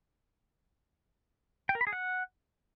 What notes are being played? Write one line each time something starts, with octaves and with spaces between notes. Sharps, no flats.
G5
A#4
B5
G#4
F#5